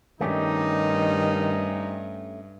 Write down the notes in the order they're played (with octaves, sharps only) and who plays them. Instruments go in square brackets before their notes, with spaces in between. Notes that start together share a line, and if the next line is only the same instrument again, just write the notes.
[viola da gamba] G2 [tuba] D#3 [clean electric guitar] A3 C#4 G4 [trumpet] D#4